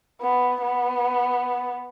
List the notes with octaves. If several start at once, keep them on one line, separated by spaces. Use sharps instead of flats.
B3
B3